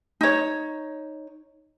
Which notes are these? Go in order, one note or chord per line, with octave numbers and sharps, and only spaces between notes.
D#4 C#5